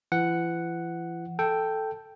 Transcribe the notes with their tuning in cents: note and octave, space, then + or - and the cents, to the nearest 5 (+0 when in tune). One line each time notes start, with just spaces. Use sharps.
E3 +40 F#5 +0
A4 +0 G5 +0